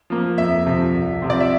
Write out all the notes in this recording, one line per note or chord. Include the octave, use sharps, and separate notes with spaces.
F3 A#3
F2 E5
C3 F3
C2
C3 F3 C4
D5
E5